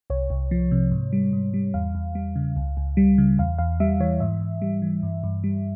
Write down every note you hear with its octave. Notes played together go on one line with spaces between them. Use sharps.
C2 C#5
C2
F3
C3
G#2
G3
G#2
G3
E2 F5
E2
G3
C#3
C#2
C#2
G3
C#3
E2 F5
E2 F5
G3 E5
E3 C#5
G#2 E5
G#2
G3
E3
G2
G2
G3